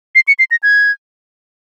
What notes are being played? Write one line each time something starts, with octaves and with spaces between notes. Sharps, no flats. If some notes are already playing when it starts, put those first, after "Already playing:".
C7
C#7
C7
A#6
G#6